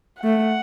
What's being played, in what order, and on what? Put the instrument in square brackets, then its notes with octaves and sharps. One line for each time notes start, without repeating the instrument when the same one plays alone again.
[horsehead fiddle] A3 [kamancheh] F#5